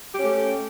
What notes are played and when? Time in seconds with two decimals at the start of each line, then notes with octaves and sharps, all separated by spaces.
0.13 G4
0.18 C#4
0.22 A3